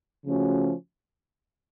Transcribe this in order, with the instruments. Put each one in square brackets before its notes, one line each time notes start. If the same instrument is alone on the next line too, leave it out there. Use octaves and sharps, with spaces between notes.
[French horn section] C#3 F3 A3 C#4 F#4